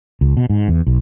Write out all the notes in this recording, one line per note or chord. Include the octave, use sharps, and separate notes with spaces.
C#2
B2
G#2
E2
B1